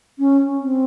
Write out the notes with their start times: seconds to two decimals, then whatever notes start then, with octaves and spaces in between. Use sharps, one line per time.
0.18 C#4
0.60 C4